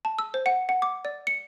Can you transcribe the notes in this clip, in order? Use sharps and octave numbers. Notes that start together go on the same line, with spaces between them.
A5
E6
C5
F#5
F#5
D6
D5
C#7